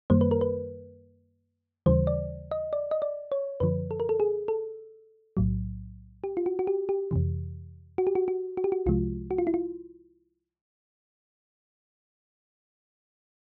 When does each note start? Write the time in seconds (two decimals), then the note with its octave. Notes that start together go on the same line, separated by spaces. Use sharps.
0.10 F#2 D#3 G3 A#3 C5
0.21 B4
0.31 A#4
0.41 B4
1.86 D#2 C#3 E3 G3 C5
2.07 D5
2.51 D#5
2.73 D5
2.91 D#5
3.02 D5
3.32 C#5
3.60 F#2 D3 F3 B4
3.91 A4
4.00 A#4
4.09 A4
4.20 G#4
4.48 A4
5.37 B1 A2 F#3
6.24 G4
6.37 F4
6.46 F#4
6.59 F#4
6.67 G4
6.89 G4
7.11 F2 C3 E3
7.98 F#4
8.07 G4
8.15 F#4
8.28 F#4
8.57 F#4
8.64 G4
8.72 F#4
8.86 C2 C3 F3 G#3 F4
9.31 F#4
9.38 F4
9.47 E4
9.54 F4